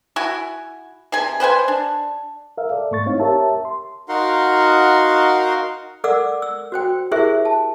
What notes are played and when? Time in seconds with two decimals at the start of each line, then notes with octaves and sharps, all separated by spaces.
0.16 E4 F#4 G#5 C#6
1.12 C3 G#4 G#5
1.40 B4 C5 F#5 G#5
1.68 D4
2.58 A#4 E5 F5
2.70 A4 D5
2.91 G#2 A3 C#6 A6
3.06 C4 D#4 E4 C#5 F5
3.20 G4 A#4 C#5 E5 A5
3.65 C6
4.09 D#4 F#4 A#4 F5 F#5 C6
6.04 A4 A#4 D5 F#5 D6 E6
6.42 E6
6.72 F#4 C5 G5
7.11 E4 G4 G#4 A#4 C5 E5
7.45 A5